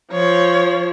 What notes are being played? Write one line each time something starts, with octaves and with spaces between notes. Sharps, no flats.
F3 C#5